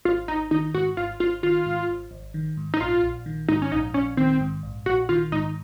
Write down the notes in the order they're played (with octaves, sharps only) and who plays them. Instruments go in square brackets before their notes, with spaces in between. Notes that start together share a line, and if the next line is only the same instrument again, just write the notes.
[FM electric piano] G#1 [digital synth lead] F4
[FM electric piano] G#1 [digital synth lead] D#4
[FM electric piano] D#3 [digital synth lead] D#4
[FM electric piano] G#2 [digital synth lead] F#4
[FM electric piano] G#1 [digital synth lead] F4
[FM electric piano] G#1 [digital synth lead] F4
[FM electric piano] D#3 [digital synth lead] F4
[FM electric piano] G#2
G#1
G#1
D#3
G#2
[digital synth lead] D#4
[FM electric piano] A#1 [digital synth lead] F4
[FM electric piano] A#1
D#3
[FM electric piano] G#2 [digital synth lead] D#4
[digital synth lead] C#4
[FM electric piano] A#1 [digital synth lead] D#4
[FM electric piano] A#1 [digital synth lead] C#4
[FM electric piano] D#3 [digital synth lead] C4
[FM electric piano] G#2
A#1
[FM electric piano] A#1 [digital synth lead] F#4
[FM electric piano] D#3 [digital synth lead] F4
[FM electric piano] G#2 [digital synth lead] D#4